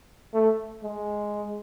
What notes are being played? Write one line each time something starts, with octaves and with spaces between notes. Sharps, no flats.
A3
G#3